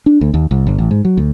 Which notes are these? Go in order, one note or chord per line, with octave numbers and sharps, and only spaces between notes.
D4
D2
D#2
C2
G1
A1
G#2
F#3
D2